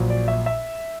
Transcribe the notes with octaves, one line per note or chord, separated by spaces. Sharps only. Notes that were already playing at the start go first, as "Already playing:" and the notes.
Already playing: A#1 A#2 F#3
D5
E5
E5